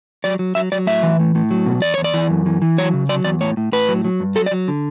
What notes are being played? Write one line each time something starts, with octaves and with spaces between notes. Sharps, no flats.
F#3 D5
F#3
F#3 E5
F#3 D5
A2 E5
E3
A2
A2
F#3
B2
E2 D5
E2 C#5
D5
E3
F#2
E3
E3
F#3 C#5
C#3
F#3 D5
E2 D5
A2 C#5
A2
A2 B4
F#3
F#3
G2
F#3 A4
D5
F#3
D3